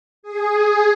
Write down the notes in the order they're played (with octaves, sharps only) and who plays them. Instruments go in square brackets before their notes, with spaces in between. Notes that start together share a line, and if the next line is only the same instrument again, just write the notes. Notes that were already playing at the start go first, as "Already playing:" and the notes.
[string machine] G#4